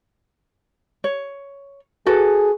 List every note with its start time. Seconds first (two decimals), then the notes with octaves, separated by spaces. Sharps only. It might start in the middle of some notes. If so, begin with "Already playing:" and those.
1.04 C#5
2.06 F#4 G#4 A4 B4